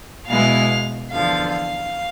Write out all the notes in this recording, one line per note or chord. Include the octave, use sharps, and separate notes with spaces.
B2 G#3 B3 E4 F5
E2 D3 F3 F5
F5